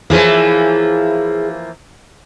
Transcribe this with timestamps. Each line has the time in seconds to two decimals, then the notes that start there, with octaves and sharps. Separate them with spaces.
0.10 E3 F3 A#3 E4 G#4 C#5